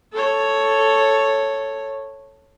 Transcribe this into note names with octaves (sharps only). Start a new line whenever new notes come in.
A4 C#5